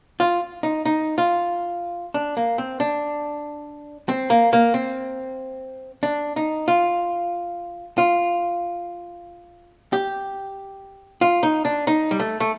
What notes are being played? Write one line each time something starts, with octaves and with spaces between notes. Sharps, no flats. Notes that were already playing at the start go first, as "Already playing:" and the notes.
F4
D#4
D#4
F4
D4
A#3
C4
D4
C4
A#3
A#3
C4
D4
D#4
F4
F4
G4
F4
D#4
D4
D#4
G3
A3
A3